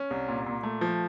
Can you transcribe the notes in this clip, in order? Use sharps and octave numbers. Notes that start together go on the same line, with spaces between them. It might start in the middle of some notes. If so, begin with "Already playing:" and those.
Already playing: C#4
C2
A#2
A#2
A3
F3